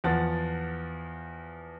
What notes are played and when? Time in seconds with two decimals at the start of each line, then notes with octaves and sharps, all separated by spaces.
0.04 E2 F3 F#5 A6